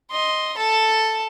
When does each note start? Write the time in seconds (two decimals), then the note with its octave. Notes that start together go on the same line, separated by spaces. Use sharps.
0.11 D#5 C6
0.57 A4 A5